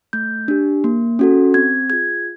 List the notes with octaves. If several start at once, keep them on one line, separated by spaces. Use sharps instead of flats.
A3 G6
D4 G4
A#3
C#4 F#4 A4
C4 G#6
F4 G#4 G#6